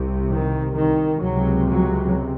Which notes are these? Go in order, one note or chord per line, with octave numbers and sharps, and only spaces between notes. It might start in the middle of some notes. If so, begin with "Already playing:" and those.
Already playing: C2 C3
D#3
D#3
C#2 C3 F#3
F#3